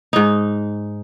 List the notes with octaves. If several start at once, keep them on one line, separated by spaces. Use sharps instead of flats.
G#2 D#4